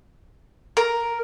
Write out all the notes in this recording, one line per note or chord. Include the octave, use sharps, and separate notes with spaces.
A#4